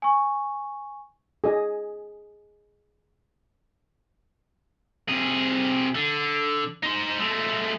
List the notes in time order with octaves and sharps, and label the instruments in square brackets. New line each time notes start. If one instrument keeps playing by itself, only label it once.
[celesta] G#5 C#6
[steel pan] G#4 D#5 G#5
[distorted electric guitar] C3 G#4
D3
D#4 C5
G#3 A3